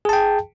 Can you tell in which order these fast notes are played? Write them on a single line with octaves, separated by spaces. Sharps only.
G#4 A5 G5